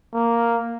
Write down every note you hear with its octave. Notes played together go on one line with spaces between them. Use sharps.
A#3